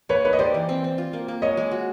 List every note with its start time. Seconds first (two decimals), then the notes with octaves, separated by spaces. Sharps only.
0.09 A#3 B4 C#5
0.25 D#4 B4 C#5
0.33 D#5
0.39 G4 C5 D5
0.54 E3
0.69 C4
0.84 C4
0.98 F4
1.13 A#3
1.28 A#3
1.42 G#3 C#5 D#5
1.57 G#3
1.71 F#4